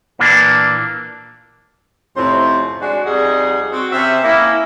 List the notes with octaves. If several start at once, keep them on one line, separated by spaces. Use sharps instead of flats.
A#2 E3 A#3 D4
F2 A2 C3 C#4 C5
G#3 D4 F#4
F2 G3 D#4 G#4 F#5
C4 F#4
C3 C#4 E5
A#3 C#4 E4